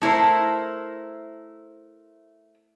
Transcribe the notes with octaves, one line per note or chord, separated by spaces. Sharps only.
A3 E4 A#4 C5